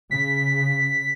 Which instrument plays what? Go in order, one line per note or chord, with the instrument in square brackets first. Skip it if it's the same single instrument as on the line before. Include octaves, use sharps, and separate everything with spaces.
[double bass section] C#3 [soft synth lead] B6